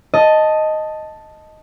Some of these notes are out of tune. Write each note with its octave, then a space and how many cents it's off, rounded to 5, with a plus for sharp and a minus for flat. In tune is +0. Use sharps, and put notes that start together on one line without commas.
D#5 +0 A5 +0